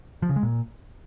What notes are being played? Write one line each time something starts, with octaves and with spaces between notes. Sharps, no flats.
F3
C#3
G#3
A#2